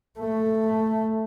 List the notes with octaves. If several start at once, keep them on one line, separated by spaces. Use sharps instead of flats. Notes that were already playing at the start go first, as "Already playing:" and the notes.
A3